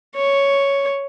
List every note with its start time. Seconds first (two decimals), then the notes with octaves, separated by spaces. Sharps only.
0.16 C#5